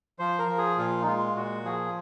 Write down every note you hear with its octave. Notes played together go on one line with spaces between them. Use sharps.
F3 C5
A#4
F3
G#4
A#2 F4
D#4
G#3 F4
A#2 F#4
F3 G#4